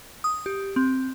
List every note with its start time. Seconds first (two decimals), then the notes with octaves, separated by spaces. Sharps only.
0.24 D#6
0.46 G4
0.76 C4